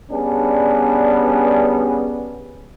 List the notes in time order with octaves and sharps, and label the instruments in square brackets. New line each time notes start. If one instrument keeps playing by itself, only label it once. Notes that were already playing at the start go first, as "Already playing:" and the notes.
[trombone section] G3 B3 C#4 D4 G#4